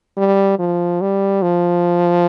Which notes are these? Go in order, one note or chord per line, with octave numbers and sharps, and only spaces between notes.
G3
F3
G3
F3